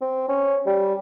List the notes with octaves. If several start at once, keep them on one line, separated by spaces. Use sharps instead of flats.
C4
C#4
G3